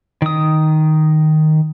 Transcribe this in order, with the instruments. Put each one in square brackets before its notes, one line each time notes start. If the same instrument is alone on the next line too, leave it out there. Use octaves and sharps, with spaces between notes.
[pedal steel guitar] D#3 D#6